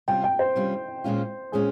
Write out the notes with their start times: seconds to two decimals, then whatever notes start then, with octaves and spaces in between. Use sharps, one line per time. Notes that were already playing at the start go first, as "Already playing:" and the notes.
0.08 C3 G3 C#4 F4 G5
0.24 G5
0.39 C5
0.56 C3 G3 C#4 F4
1.04 A#2 G#3 C#4 F4
1.52 A#2 G#3 C#4 F4 G#4